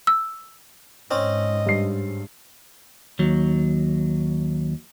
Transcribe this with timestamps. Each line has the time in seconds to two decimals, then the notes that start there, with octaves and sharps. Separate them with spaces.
0.07 E6
1.11 G#2 C4 C#4 D#5
1.66 G2 C7
3.19 D#2 F#3